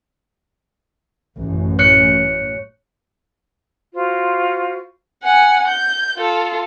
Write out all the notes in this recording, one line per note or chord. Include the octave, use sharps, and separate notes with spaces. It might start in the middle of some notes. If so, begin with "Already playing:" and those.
A1 F#2
C#5 F#6 C#7
F4 F#4 C5
F#5 G#5
G6
F4 A4